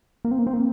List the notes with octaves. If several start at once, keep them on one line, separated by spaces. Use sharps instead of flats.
A#3
C4
A#3
C4
A#3